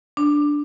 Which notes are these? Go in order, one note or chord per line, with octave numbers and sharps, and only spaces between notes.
D4